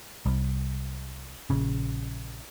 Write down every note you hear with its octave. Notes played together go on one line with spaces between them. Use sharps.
C2
A#1 C#3